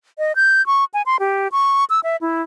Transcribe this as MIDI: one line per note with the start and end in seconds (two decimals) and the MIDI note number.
0.18 0.32 75
0.36 0.64 91
0.66 0.85 85
0.94 1.02 80
1.06 1.17 84
1.20 1.48 67
1.52 1.84 85
1.90 2.00 88
2.04 2.16 76
2.21 2.42 64